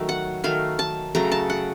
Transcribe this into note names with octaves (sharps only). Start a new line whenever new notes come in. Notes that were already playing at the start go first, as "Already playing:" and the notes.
Already playing: D#3 F#3 A3 A5
F#5
D#3 F#3 A3 F5
A5
C#3 F#3 A3 A#5
A5
F#5